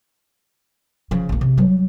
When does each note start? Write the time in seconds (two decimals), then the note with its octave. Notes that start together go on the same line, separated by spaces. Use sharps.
1.11 C#3 F3
1.29 A#1 A#3
1.41 C3
1.57 F#3 G3